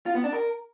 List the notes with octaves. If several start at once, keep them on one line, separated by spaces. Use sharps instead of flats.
F4
B3
D4
A#4